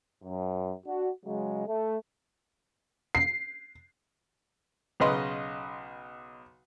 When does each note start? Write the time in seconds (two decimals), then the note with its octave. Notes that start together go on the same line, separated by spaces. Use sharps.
0.24 F#2
0.86 D4 F#4
1.26 C#3 F#3 G#3
1.67 A3
3.15 C7
5.00 B1 C#3 B4 D#5 C6